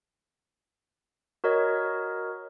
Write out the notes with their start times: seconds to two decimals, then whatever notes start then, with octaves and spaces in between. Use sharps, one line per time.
1.44 F#4 A#4 C#5 D#5